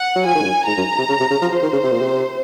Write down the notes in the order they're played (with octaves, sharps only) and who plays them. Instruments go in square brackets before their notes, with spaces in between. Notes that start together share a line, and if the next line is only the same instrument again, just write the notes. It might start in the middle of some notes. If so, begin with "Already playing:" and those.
Already playing: [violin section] F#5
[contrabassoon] F#3
[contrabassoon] F3 [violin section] G#5
[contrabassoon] D#3
G#2
F#2
[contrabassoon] G#2 [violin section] A#5
[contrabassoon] F#2
C3
C#3
C3
C#3
F3
[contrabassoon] F3 [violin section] C5
[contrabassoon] D#3
C#3
C3
A#2
C3